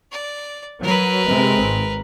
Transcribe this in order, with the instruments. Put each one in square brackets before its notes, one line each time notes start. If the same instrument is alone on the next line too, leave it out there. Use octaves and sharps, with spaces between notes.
[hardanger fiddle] D5
[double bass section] F#3 [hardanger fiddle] A#4 B4
[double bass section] C3 G#3 C4
G#1